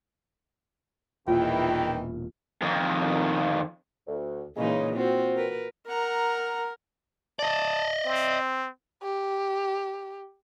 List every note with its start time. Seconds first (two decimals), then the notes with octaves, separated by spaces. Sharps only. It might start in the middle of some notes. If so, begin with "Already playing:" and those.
1.28 E1 E2 A#2 D#3 E3 F4 G5
2.62 F2 D#3
4.07 D2
4.57 A#2 C#3 E3 G#3 D#4
4.96 C4 F4 F#4
5.36 A#4 B4
5.88 A#4 F#5 A#5
7.39 D5 D#5 A5
8.06 C4
9.03 G4